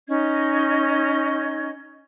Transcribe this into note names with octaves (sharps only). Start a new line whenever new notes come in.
C#4 D#4 D#5 G#6